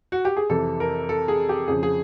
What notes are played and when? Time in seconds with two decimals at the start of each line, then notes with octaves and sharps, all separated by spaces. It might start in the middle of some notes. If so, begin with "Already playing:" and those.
0.12 F#4
0.25 G4
0.37 G#4
0.49 F2 C3 E3 A4
0.80 A#4
1.09 A4
1.28 G#4
1.49 G4
1.68 F2 C#3 F3 G#4
1.83 G#4